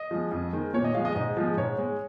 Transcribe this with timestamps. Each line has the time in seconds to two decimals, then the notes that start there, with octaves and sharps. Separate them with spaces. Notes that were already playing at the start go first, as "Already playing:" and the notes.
Already playing: D#5
0.11 F3 G#3
0.32 F2
0.53 D#3 G#3
0.73 A#2 C#5
0.84 D#5
0.95 F3 G#3 F5
1.05 D#5
1.16 G#2 D#5
1.37 F3 G#3
1.57 G#2 C#5
1.78 G#3